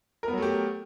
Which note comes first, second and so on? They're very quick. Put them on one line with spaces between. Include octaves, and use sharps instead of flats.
A#4 B3 F#3 A3 G4